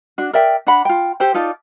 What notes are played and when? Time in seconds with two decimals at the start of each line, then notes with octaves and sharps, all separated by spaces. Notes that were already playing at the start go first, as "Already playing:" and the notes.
0.18 D4 F#4
0.33 A#4 D5 E5 G5
0.67 D4 F#5 B5
0.85 F4 G5
1.20 G4 A4 C5 G5
1.34 D#4 F4 A4 D5